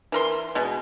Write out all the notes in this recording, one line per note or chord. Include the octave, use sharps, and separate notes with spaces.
E3 A#4 C6
B2 G#3